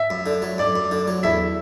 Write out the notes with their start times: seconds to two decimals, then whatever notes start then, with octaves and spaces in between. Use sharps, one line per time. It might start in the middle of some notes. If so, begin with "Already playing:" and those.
Already playing: E5
0.10 F#2
0.26 D3
0.42 F#3
0.58 F#2 D5
0.76 F#2
0.92 D3
1.08 F#3
1.23 E2 E5